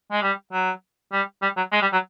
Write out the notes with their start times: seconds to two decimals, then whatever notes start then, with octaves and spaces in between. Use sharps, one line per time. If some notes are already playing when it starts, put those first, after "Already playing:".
0.12 G#3
0.22 G3
0.53 F#3
1.12 G3
1.42 G3
1.57 F#3
1.72 G#3
1.82 G3
1.93 F#3